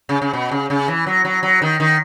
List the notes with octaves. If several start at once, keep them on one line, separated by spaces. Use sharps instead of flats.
C#3
C#3
B2
C#3
C#3
E3
F#3
F#3
F#3
D#3
D#3